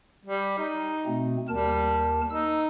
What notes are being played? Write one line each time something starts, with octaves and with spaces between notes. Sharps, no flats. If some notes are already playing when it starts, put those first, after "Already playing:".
G3
D#4
B2 A3 C4
D#2 G3 A#4 A5
D#4 E6